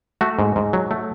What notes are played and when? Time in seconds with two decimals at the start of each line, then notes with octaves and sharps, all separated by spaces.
0.21 A3 F#4
0.39 G#2
0.56 G#2
0.73 F#3
0.91 A3